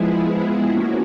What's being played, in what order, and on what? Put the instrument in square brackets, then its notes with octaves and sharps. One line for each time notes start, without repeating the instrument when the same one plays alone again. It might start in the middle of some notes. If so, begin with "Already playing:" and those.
Already playing: [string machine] F3 G#3 B3 E4 G#4
F3 A#3 C#4 F#4